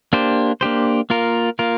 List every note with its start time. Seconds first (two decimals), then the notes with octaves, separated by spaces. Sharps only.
0.13 A#3 D4 G4 C5
0.61 A#3 D4 G4 C5
1.10 A#3 F4 A#4
1.59 A#3 F4 A#4